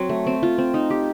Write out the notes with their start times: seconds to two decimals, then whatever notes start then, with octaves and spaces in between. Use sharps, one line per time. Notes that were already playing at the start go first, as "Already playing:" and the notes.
Already playing: F#3 C4
0.09 A3
0.27 C4
0.43 F4
0.58 C4
0.74 D#4
0.90 G4